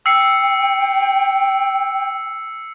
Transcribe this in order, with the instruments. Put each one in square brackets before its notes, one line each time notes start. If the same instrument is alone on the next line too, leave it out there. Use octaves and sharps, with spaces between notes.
[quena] G5 [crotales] E6 C7 C#7